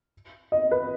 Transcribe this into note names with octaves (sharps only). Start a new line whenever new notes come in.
D#5
B4